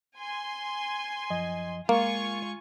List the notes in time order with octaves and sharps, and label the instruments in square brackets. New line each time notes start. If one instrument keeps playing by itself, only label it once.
[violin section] G#5 C6
[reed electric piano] F#2 F3 D#5
[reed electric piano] G#3 [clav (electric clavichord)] A#3 [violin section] F4 G#5 C#6